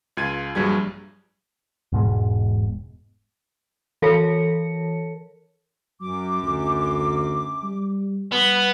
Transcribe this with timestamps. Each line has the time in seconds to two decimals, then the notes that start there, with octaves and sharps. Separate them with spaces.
0.17 C#2 F4 G#6 D#7
0.55 A#1 G2 F#3 G3 G#4 G#6
1.92 E1 G#2 B2 G#3
4.02 E3 A4 A#4 C#5 A5 C#7
6.01 F#2 F#3 D6
6.42 D2
7.63 G3
8.32 G3 B3